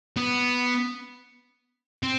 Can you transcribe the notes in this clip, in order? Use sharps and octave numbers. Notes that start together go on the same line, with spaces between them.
B3
C4